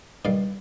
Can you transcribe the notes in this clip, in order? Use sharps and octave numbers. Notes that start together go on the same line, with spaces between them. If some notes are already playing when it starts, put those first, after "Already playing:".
G2 D#3 G3 D5 F5